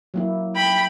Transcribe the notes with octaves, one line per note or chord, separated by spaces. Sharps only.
F#3 A#3 E4
G5 B5 B6